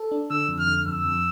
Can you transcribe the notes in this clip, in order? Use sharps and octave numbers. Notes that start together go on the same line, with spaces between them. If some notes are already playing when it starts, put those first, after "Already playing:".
Already playing: A4
D4
D3 E6
F2
F6
D3
F2 E6
F2